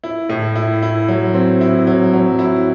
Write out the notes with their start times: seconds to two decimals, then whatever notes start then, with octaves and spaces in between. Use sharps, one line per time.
0.04 E4
0.29 A2
0.55 E4
0.83 E4
1.08 F#3
1.34 C4
1.61 E4
1.87 F#3
2.13 F#3
2.39 E4